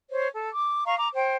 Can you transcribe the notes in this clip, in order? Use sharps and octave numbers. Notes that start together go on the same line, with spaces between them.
C5 C#5
A4
D6
D#5 F5 A#5 C#6
A#5 D6
C5 G5